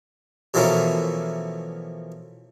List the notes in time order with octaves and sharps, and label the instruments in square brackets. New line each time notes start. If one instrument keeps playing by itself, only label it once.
[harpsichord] B2 E3 F3 A3 A#3 C#4